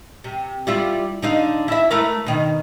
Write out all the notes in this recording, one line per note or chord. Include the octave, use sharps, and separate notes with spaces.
C3
G3 E4 F4
D3 D#4 F5
E4 E5
A3 A#4 B4
B2 D#3